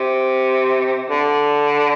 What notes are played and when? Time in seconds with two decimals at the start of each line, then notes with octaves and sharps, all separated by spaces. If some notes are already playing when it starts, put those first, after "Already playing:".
Already playing: C3
1.10 D3